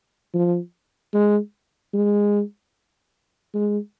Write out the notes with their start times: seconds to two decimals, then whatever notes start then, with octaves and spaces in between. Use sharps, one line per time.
0.34 F3
1.14 G#3
1.94 G#3
3.54 G#3